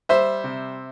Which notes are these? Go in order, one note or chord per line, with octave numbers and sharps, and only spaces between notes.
G3 C5 E5
C3